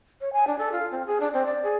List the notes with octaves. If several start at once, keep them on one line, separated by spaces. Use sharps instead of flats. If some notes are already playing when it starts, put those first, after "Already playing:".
C#5
G#5
D4
A4
F4
C4
G#4
D4
C4
D5
G#4